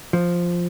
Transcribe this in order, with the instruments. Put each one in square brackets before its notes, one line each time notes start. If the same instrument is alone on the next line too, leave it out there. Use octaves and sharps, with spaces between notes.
[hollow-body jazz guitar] F3